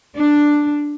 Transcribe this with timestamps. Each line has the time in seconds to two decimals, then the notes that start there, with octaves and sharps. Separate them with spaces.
0.16 D4